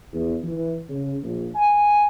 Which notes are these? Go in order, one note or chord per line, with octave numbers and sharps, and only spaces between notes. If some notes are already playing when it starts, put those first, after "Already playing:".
E2
E3
C#3
A#1
G#5